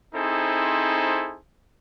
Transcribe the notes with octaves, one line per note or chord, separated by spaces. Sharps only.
C4 D#4 E4 G#4 A4 C5